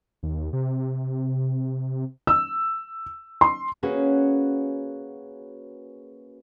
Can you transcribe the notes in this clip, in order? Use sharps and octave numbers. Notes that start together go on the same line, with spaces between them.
D#2
C3
E6
C6
A#3 C#4 F#4 G#4 B4